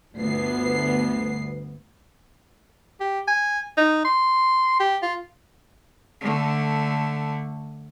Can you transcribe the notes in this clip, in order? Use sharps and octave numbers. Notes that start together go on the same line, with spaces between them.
G1 D2 B3 C7
G4
G#5
D#4
C6
G4
F4
D3 A3